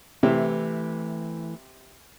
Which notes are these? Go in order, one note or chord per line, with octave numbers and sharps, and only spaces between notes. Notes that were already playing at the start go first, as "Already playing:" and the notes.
C3 E3 A3 C4 E4